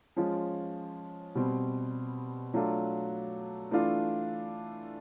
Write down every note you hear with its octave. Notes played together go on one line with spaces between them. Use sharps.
F3 G#3 C#4 F4
B2 G3 C4
F#3 A3 D4 F4
E3 A3 D4 F4